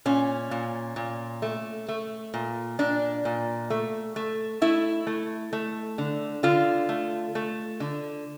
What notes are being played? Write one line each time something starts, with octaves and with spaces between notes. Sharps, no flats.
A#2 C#4
A#2
A#2
A3
A3
A#2
A#2 D4
A#2
A3
A3
A3 E4
A3
A3
D3
D3 F4
A3
A3
D3